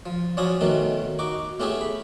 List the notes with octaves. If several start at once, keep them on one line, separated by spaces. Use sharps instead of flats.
F3
F3 F#3 C#4 D4 G#5 D#6
B2 D#3 F#3 A3 C#4
D#4 F#4 D6
A3 B3 C#4 E4 G4 G#4
B5